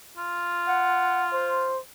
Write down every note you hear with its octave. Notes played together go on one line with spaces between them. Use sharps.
F4
F#5
C5